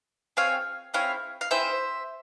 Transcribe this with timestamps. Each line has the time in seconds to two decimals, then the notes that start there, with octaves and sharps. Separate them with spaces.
0.37 C4 F4 G#4 C#5 F5
0.94 C4 E4 G#4 C#5 F5
1.41 F5
1.51 C4 E4 G#4 C5 E5